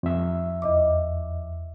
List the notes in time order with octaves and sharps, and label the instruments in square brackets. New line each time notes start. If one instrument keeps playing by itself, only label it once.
[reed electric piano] F2 E5
[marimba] E2 D#5 D6